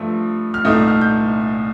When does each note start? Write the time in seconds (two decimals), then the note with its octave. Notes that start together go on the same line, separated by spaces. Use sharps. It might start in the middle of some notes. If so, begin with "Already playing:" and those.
Already playing: G2 F3 A3
0.54 F6
0.65 C2 A#2 A3 D#4 D#6
0.88 F6
1.01 G6